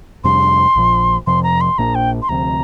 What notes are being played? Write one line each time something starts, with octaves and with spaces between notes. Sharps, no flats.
F2 C3 G3 D4 C6
A#1 A#2 F3
F2 C3 F3 C6
A#5
C6
A#1 A#2 A#3 D4 A#5
G5
C6
D2 C3 F3 C4 A#5